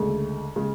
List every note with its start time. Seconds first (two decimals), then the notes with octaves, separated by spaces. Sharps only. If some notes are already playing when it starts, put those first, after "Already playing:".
Already playing: D2 C#3 G#3
0.56 C#3 G#3